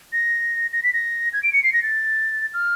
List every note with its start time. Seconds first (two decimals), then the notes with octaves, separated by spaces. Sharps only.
0.13 A#6
0.73 A#6
0.83 B6
0.93 A#6
1.33 G#6
1.43 D7
1.53 C#7
1.64 C7
1.73 A#6
1.83 A6
2.54 F6